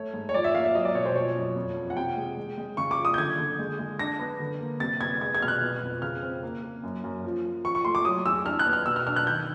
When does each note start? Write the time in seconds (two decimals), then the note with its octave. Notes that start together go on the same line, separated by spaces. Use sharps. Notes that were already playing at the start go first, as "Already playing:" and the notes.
Already playing: A3 C#5
0.14 G#2
0.29 C#5
0.34 F3 D5
0.44 E5
0.54 A#3 F5
0.65 E5
0.75 F#3 D#5
0.85 D5
0.95 B2 C#5
1.05 C5
1.15 F3 C#5
1.36 F#2
1.56 F2
1.76 F3
1.90 F#5
1.97 C3 G5
2.17 G#3
2.37 G#3
2.57 G#3
2.77 C#3 C#6
2.91 D6
2.98 F3
3.05 D#6
3.14 G6
3.18 D3 G#6
3.38 D3
3.59 G#3
3.79 G#3
3.99 D4 A#6
4.19 B3
4.40 D3
4.60 A#3
4.80 C3 A6
5.01 B3 G#6
5.21 G#3 G#6
5.35 G#6
5.42 B2 F6
5.48 F#6
5.62 B3
5.82 F2
6.02 C#3 F6
6.23 C4
6.43 A#3
6.63 A#3
6.83 F#2
7.04 F#2
7.24 F3
7.45 F3
7.65 F3 C#6
7.75 C#6
7.85 A3 C6
7.95 D6
8.05 F#3 D#6
8.26 E2 E6
8.46 D4 F6
8.59 F#6
8.66 B3
8.73 F6
8.86 B2 E6
8.96 F6
9.07 D4 F6
9.16 F#6
9.27 D#3 G6